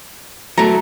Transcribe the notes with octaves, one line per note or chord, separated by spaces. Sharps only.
F#3 A3 A#5